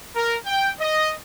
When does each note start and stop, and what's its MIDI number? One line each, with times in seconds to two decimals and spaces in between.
0.16 0.36 70
0.46 0.69 79
0.81 1.12 75